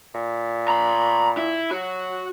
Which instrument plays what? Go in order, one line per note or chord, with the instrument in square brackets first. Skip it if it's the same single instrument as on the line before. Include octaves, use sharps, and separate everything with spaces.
[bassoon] A#2
[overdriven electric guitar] A#5 B5
E4
[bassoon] F#3 [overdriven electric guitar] F#4